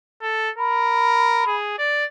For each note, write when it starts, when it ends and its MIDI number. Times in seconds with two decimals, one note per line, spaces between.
0.22 0.50 69
0.58 1.45 70
0.58 1.55 83
1.47 1.76 68
1.78 2.05 74